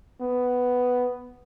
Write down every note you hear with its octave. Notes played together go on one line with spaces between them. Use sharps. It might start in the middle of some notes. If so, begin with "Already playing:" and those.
B3